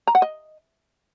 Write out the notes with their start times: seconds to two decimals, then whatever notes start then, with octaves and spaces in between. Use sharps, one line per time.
0.07 A#5
0.15 F#5
0.22 D#5